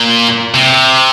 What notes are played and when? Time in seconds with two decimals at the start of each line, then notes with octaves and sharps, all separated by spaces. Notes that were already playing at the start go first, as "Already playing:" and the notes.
Already playing: A#2
0.54 C3